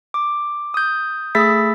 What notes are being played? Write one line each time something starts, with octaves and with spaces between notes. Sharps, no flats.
D6
D#6 G6
A3 G#4 B5 E6 A6 B6